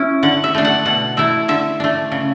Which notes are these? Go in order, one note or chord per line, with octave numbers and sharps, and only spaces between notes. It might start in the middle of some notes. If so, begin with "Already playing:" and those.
Already playing: C#4 E4
D3 F#5
E5
A3 D4
F#5
B2 F#5
A3 E4 E5
D3 E5
A3 D4
C#3